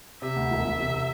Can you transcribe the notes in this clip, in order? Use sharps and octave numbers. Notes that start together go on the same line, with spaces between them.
C3 E5
D2
E1
E1
C3